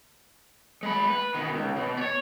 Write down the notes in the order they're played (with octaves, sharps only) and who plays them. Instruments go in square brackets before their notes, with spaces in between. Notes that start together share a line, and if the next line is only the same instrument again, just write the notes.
[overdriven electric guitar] G#3 B5
B4
B2 D#3
C#2
B2
C#5 D5